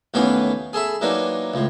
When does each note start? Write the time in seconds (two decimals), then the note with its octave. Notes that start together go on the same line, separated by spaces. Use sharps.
0.14 D#2 A2 E3 B3 C#4 B5
0.73 G#4 A4 E5 B5
1.01 E3 F#3 A#3 D4 D#4
1.54 C#2 A2